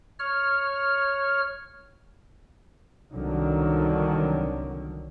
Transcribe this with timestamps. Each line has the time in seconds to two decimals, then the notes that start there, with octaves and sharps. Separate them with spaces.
0.19 C#5 F6
3.13 C2 D3 D#3 F#3